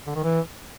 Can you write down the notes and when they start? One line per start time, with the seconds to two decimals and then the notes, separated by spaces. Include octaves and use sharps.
0.07 D3
0.15 D#3
0.24 E3